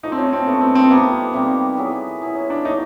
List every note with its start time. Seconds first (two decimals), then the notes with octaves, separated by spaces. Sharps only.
0.03 F3 A3 D4 D#4
0.12 C4
0.18 C#4
0.33 C4
0.47 F3 A3 B3 D4
0.61 C4
0.75 C4
0.91 C3 D#3 G3 A#3 B3
1.33 C3 D#3 G3 A#3
1.78 F#3 B3 E4 G#4
2.22 F#3 B3 E4 G#4
2.35 C#4
2.50 D4
2.64 F#3 A#3 C#4 D#4